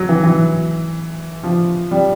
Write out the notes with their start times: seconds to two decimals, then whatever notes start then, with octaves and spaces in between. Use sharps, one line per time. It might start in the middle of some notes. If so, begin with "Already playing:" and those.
Already playing: F#3
0.09 E3
0.24 E3
1.43 F3
1.91 G3